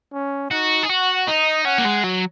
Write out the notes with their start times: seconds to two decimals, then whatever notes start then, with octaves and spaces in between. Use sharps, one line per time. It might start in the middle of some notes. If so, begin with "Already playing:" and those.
0.13 C#4
0.51 D#4 F#4
0.83 G#4
0.89 F#4 F#5
1.27 D#4 D#5
1.65 C#4 F#5
1.78 A#3
1.85 G#3
2.04 F#3